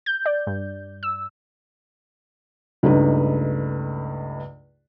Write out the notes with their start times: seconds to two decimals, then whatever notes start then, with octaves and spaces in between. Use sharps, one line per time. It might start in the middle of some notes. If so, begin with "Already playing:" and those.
0.06 G6
0.26 D5
0.47 G2
1.03 E6
2.83 C#2 G2 A3 D#4 B4